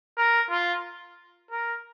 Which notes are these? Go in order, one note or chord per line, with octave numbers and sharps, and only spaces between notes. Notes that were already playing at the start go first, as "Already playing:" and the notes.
A#4
F4
A#4